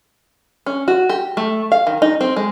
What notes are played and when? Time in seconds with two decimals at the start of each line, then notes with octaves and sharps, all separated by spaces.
0.66 C#4
0.88 F#4
1.10 G4
1.37 A3
1.72 F5
1.87 D#3
2.02 D#4
2.21 C4
2.37 G#3